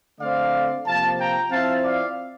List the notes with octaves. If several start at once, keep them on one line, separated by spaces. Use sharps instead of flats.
D3 A3 C4 D5 F5
C3 F3 A#3 F5 A5
G5 A#5
F3 C4 E4 F5 A5
D5 F5